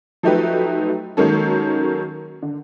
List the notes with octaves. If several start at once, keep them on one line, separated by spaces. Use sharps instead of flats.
F3 F#3 A3 D#4 G4 B4
D#3 F#3 G#3 A#3 C#4 A4
D3